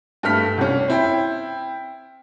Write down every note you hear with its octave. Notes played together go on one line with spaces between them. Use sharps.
G2 A3 F6 B6
C2 C#4
C4 E4 G5